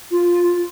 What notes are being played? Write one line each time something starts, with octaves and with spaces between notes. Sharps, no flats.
F4